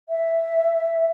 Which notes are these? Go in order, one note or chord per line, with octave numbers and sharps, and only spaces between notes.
E5